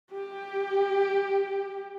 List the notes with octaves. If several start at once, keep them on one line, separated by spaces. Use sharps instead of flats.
G4